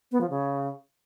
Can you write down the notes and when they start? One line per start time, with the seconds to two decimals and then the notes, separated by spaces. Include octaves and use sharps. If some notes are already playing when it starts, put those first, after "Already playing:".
0.12 B3
0.21 F3
0.30 C#3